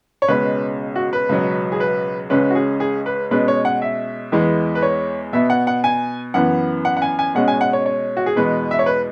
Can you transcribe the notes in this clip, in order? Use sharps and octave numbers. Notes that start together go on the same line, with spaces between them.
C#5
C#2 B2 G#3 C#4 B4
F#4
B4
C#2 B2 F#3 B3
G#4
B4
C#2 C#3 G#3 C#4 B4
F#4
G#4
G#4
B4
B2 G#3 C#4 B4
C#5
F#5
E5
E2 E3 G#3 B3
B4
C#5
B2 B3 E5
F#5
F#5
G#5
F#2 E3 B3 F#5
F#5
F#5
G#5
G#5
B2 G#3 C#4 F#5
G#5
F#5
C#5
C#5
F#4
G#4
E2 B2 G#3 B3 B4
E5
C#5
B4